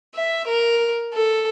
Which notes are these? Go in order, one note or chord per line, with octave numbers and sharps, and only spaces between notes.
E5
A#4
A4